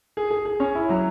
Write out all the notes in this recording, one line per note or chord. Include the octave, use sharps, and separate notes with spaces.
G#4
G#4
G#4
C#4
E4
F#3